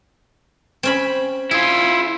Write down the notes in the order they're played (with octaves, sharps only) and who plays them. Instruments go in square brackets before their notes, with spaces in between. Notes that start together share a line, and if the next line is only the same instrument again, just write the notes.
[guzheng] C4 C#4 B5
[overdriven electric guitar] E4 F4 [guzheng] G#4